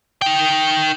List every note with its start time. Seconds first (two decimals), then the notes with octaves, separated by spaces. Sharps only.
0.22 D#4 G5